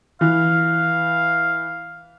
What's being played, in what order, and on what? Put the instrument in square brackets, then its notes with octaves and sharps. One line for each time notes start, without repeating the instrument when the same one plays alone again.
[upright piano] E3 [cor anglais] F5